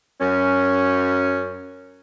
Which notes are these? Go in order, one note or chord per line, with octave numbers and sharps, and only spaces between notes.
F#2 C#4